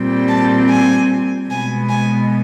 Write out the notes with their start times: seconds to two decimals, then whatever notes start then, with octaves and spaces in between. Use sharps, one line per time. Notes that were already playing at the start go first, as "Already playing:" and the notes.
Already playing: A#2 G3 C4
0.28 A5
0.69 G#5
1.49 B2 G#3 B3 G#5
1.89 G#5